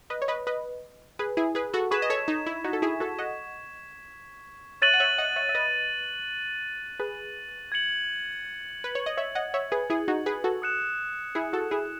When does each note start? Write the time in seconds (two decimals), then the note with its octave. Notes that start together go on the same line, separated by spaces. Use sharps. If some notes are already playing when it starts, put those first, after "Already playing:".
0.10 B4 D#5
0.22 C#5
0.28 B4 D#5
0.47 B4 D#5
1.19 G#4 B4
1.37 E4 G#4
1.55 G#4 B4
1.74 F#4 A4
1.91 G#4 B4 C#6 G#6 B6 E7
2.02 D#5
2.10 A4 C#5
2.28 D#4
2.46 E4
2.64 D#4 F#4
2.73 A4
2.82 E4 G#4
3.00 F#4 A4
3.19 D#5 F#5
4.82 C#5 E5 F#6 A6 D#7 F#7
4.93 F#5
5.00 C#5 E5
5.18 D#5 F#5
5.36 C#5 E5
5.49 E5
5.55 B4 D#5
6.99 G#4 B4
7.72 G#6 C#7 F#7
8.84 B4
8.95 C#5
9.06 D#5
9.17 C#5 E5
9.35 D#5 F#5
9.54 C#5 E5
9.72 G#4 B4
9.90 E4 G#4
10.08 D#4 F#4
10.26 G#4 B4
10.44 F#4 A4
10.62 D#6 F#6 C#7 E7
11.35 E4 G#4
11.53 F#4 A4
11.71 E4 G#4